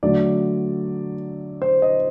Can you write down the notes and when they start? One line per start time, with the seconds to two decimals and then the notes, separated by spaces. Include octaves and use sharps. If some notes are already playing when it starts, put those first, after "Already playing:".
0.03 D3 F#3 A3 D5
1.62 C5
1.82 D#5